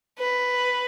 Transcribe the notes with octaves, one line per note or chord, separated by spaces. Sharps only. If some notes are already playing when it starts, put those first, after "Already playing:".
B4